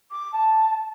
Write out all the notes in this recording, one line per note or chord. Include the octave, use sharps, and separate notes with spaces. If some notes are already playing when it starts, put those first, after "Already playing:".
D6
A5